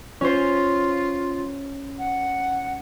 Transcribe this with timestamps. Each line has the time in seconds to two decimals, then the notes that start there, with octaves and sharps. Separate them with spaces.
0.21 C#4 F4 C5
1.99 F#5